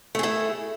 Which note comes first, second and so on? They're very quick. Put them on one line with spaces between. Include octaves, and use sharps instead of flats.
A3 G#4 E4